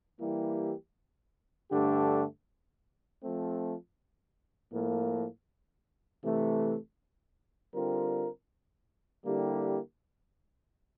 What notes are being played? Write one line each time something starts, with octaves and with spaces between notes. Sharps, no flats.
E3 G3 A#3 E4 G4
G2 D3 A3 D4 G4
F3 A3 C4
A2 F3 A#3
C3 E3 A3
D3 G3 C4 F4 A#4
D3 G3 A#3 E4 G4